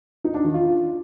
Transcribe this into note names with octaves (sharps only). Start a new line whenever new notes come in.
D#4
D4
D#3
F4